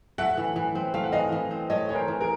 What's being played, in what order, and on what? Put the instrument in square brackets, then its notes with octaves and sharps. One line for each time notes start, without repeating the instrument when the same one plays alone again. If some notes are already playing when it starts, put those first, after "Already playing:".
[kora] A3 [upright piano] E5 F#5
[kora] E3
E3
C4
[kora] A3 [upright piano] F5
[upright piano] F#5
[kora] E3 [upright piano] D#5 F5
[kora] E3
C4
[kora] A3 [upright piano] C#5 D#5
[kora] E3 [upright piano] C#5
[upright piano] A#4 C5
[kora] E3
[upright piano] G#4 A#4